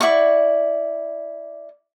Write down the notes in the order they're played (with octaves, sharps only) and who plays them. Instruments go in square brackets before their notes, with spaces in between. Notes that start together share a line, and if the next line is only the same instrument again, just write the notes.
[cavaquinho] E4 D5 F#5 C#6